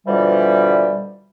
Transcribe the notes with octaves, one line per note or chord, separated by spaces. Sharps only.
B2 D3 E3 F3 G3